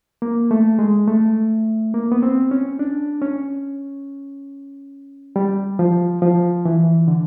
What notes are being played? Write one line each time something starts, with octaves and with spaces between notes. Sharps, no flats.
A#3
A3
G#3
A3
A#3
B3
C4
C#4
D4
C#4
G3
F3
F3
E3
D3